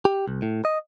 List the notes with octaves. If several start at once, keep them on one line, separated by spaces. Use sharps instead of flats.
G4
C2
A2
D#5